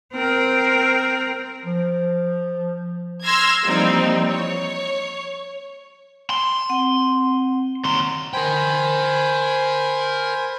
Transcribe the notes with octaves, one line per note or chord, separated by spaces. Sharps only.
C4 A#4
F3
C6 E6 F6 G#6 A#6
E3 F3 G3 A#3 C4 D#4
C#5
C6
C4 F#5
D#2 A#5 C6
A#4 C5 G5 G#5 B5